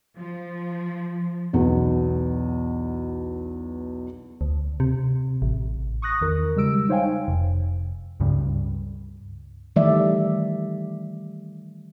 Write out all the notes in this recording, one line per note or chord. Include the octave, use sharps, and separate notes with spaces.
F3
B1 E2 B2
D2
C3
A1
C#6 D#6 F#6 A#6
E2 D#3 A#4
C#3 G3 G#3 E6 D7
D#4 C5 C#5 F5 G5 G#5
F1
C#2 G2 C#3 G3
D#3 E3 G3 A3 D5 E5